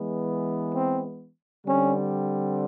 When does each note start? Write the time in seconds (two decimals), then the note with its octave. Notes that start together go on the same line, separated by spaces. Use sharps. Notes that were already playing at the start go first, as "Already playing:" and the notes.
Already playing: E3 G#3 B3
0.73 C4
1.65 D3 G3 C4 C#4